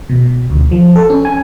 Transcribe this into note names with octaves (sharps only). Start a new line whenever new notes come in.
B2
D2
F3
A4
C#4
G#5